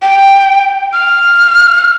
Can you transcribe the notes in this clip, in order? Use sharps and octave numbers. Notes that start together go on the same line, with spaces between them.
G5
F6